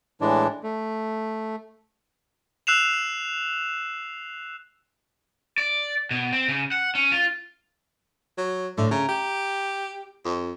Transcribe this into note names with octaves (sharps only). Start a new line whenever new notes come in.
A2 E3 G#3 D4
A3
E6 F#6 C7 E7 F7
D5
B2
C4
C#3
F#5
C#4
F4
F#3
A2 D3
C#3 A#5
G4
F2